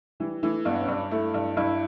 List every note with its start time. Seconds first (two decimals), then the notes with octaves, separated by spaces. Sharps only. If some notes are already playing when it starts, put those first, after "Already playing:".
0.20 E3 G3
0.43 E3 A3
0.65 G2 B3
0.82 C#4
0.88 G2 D4
1.11 A3 E4
1.34 G2
1.57 G2 E4